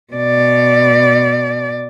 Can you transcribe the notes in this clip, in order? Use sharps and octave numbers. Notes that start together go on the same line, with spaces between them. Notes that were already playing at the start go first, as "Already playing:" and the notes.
B2 D5